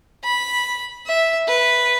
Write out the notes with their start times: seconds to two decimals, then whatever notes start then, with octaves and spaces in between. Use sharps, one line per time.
0.24 B5
1.06 E5
1.48 B4